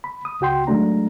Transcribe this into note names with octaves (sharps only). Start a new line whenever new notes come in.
B5
D#6
C#2 F#4 G5 C6
D#3 F#3 G#3 A3 D4 A#5